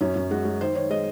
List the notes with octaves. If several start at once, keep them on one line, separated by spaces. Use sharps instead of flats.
F#2 C#4
F#2
G#3 F#4
G#3
D#3 C5
D#3 C#5
G#3 D#5